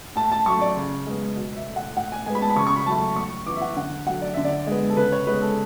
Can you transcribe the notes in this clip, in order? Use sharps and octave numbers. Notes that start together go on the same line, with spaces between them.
A2 A5
A5
F#3 A3 C#6
D5
C#3
G#3 B3
B2
E5
A3
F#5
A2 F#5
G#5
G#3 B3 G#5
B5
A5
B5
C#3 C#6
C#6
B5
F#3 A3 A5
A2 C#6
E3 B3 D6
E5
F#5
D3 F#5
F#3 A3 F#5
D5
D3 E5
D5
G#3 B3
A4
C#3 B4
C#5
G#3 B3 B4
A4